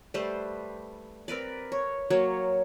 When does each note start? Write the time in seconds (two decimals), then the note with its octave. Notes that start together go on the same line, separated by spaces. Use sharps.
0.14 G3 A3 B4 C5
1.28 C4 A#4 B4 D5
1.72 C#5
2.10 F#3 A#3 C#5